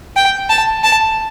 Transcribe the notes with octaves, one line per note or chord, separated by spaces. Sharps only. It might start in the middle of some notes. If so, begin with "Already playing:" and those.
G5
A5
A5